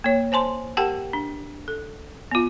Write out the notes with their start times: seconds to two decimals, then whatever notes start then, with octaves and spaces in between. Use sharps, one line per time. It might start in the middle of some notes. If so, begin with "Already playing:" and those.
0.04 A#3 C#5
0.32 C5 G#5 A5 C6
0.77 G4 A#4 F#5 G5 A5
1.13 D4
1.68 A4
2.31 B3 F4